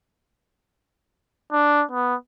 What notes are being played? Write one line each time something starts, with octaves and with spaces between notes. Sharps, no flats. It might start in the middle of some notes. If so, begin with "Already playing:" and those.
D4
B3